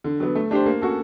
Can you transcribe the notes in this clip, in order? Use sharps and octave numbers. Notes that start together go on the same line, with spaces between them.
D3
F#3 B3
A3
D4 G4 C5
A#3
C#4 F#4 A4